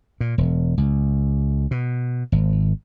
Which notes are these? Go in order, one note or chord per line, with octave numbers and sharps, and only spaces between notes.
A#2
E1
C#2
B2
G#1